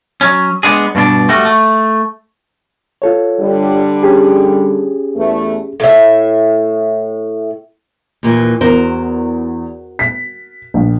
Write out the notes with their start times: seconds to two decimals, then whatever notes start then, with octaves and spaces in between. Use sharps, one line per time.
0.21 F#3 C#4
0.63 G#3 A3 B3 D4 G#4
0.95 G2 B2 D4
1.29 G3 A3 F#4
1.45 A3
3.02 F4 A4 C#5
3.39 D3 G3
4.03 C#4 G4 G#4
5.15 E2 A3
5.80 A2 E5
8.23 D#2 A#2 E3
8.61 E2 F#4 A#4 C5
9.99 B6
10.74 A#1